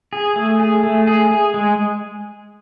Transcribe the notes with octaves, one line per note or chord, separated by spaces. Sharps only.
G#4
A3
G#4
A3
G#4
G#4
G#3